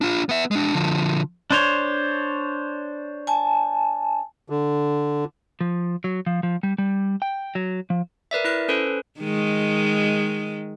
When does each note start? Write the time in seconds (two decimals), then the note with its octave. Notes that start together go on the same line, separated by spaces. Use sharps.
0.01 D4 F4
0.29 B3 E5
0.51 G#3 D4
0.74 D3 F3
1.51 D4 C5 C#5
3.27 G#5 A5
4.50 D3
5.61 F3
6.04 F#3
6.27 F3
6.43 F3
6.63 G3
6.78 G3
7.22 G5
7.55 F#3
7.90 F3
8.31 A#4 B4 D5 E5
8.44 E4 B4 F#6
8.68 C#4 A4 B4 C5
9.19 D#3 G#3